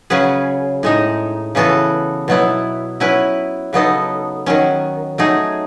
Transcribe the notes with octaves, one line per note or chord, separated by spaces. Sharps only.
C#3 F#3 C#4 G#4 B4
A2 G#3 D#4
C#3 E3 B3 F#4 A4
B2 F#3 B3 E4
F#3 C#4 E4 B4
C#3 F#3 B3 D#4 A4
D#3 F#3 C#4
F#3 A3 D#4 G#4